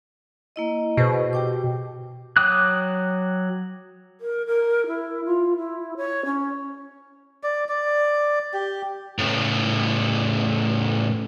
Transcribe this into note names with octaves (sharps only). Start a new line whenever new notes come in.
A#3 E4 D#5
B2 G#4 B4 C5
G4 G5 D6
F#3 G5 D6 D#6 F#6
A#4
A#4
E4
F4
E4
C#5
C#4
D5
D5
G4
A2 C#3